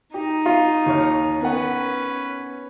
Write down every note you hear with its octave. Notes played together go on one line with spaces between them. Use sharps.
D#4 G4
F4
D#2 C#5 F6
B3 C#4 A#4 B4 F#5